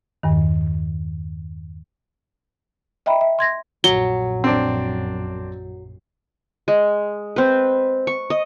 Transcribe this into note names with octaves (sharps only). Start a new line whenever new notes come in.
E2 G2 D#3
D#5 E5 G5 A#5 B5
E5
C6 G#6 A#6
A#1 F#2 F#3 G7
C4 D4
G#3
C4 B4
C#6
D#5